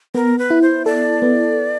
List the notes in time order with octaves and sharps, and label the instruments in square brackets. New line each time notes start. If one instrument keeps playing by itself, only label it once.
[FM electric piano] B3 [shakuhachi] A#4
[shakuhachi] B4
[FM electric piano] E4
[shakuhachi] C5
[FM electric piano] A4 [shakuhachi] D5
[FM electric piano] B3